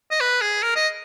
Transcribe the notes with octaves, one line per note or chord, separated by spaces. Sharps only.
D#5
B4
G#4
A#4
D#5